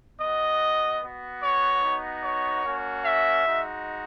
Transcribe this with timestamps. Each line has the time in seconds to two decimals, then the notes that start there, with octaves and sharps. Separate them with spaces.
0.20 B3 F#4 D#5
1.01 B3 F#4
1.43 C#5
1.83 B3 D#4 F#4
2.24 C#5
2.64 A#3 C#4 F#4
3.05 E5
3.45 G#3 D#4 F#4